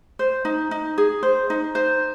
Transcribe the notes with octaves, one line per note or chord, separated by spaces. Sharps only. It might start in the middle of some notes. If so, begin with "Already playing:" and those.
C5
D#4
D#4
G#4
C5
D#4
C5